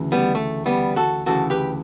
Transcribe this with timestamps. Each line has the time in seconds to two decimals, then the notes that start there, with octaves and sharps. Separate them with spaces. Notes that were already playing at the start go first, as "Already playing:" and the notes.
Already playing: D2 C#3 E3
0.12 G3 B3
0.35 A3
0.66 G3 B3
0.96 F#4 A4
1.26 D2 C#3 E3 F#4 A4
1.50 G4 B4